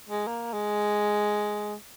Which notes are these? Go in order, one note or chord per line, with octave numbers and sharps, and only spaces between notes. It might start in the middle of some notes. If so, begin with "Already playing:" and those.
G#3
A#3
G#3